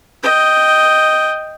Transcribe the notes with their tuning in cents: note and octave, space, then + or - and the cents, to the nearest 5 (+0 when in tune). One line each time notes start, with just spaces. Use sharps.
D#5 +0 G5 +0